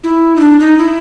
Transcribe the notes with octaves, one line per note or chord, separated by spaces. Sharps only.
E4
D#4
D4
D#4
E4